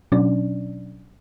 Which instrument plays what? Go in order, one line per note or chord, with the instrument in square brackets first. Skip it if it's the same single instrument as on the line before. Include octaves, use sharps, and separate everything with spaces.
[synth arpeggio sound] B2 F#3 C#4 D4 D5